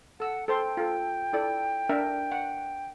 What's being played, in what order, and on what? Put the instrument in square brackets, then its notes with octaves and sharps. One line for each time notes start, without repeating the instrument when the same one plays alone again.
[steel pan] A4 E6 [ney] F#5
[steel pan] A4 C5 C6 [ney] G5
[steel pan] F4 A4
E4 A4 D5
D4 A#4 E5
F#5